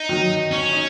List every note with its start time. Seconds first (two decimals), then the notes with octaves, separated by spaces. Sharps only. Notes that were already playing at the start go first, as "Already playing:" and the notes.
Already playing: D#4
0.09 D#3 F#3
0.51 C#4
0.72 D#4